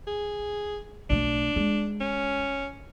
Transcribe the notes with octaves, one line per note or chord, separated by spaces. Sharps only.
G#4
B1 A3 D4
G#3
C#4